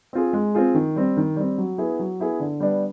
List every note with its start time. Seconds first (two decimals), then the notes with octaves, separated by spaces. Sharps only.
0.13 C4 F4 G#4
0.33 G#3
0.55 C4 F4 G#4
0.74 D#3
0.96 G3 C4
1.17 D#3
1.36 G3 C4
1.58 F#3
1.78 B3 E4 G#4
1.99 F#3
2.20 B3 E4 G#4
2.40 D3
2.60 G3 B3 D4